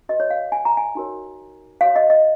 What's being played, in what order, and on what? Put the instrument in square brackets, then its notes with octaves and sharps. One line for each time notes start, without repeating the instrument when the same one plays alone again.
[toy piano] F#4 B4 D#5
C#5
F5
G#5
A#5
G#5
D#4 F#4 A#4 C#5
F#4 C#5 F5
D#5
D#5